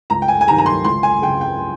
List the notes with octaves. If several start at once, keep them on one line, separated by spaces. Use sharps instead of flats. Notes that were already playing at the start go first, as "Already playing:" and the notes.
C#2 A#5
G5
G#5
G#5
C3 D#3 A#5
A#5
C6
C#2 C6
G#5
C#3 G5
G5